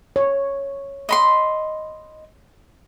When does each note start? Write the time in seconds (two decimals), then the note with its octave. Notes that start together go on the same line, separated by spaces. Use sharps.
0.16 C#5
1.09 D#5 B5 C6